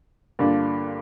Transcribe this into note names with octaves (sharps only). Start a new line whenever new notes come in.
G2 D3 A#3 D4 F4